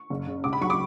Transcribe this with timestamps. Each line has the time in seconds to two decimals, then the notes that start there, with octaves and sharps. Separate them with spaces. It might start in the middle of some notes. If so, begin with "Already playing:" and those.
Already playing: C#6
0.10 F#1
0.27 C#3
0.44 C#2 D6
0.53 B5
0.61 F#3 C#6
0.70 D6